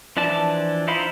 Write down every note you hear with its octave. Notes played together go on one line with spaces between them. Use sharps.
E3 F3 D4 D5 A5
D#4 E4 C5 F5 B5